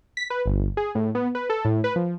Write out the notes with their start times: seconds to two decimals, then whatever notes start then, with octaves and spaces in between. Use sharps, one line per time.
0.17 B6
0.30 B4
0.46 G1
0.77 G#4
0.95 A2
1.15 B3
1.35 B4
1.50 A4
1.65 A2
1.84 B4
1.96 F3